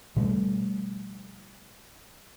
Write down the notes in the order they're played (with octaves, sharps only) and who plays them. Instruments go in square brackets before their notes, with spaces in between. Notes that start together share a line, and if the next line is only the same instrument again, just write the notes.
[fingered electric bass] B2 F3 G3 A3